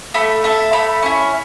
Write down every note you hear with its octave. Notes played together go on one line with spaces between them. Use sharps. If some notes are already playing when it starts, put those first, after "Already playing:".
A3 B5
E4 A4
A3 B5
C#4 E4